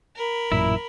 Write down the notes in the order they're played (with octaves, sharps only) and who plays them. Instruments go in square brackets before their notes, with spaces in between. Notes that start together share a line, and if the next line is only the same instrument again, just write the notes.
[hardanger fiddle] A#4 B5
[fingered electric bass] A1 F#2 A#2 [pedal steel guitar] E4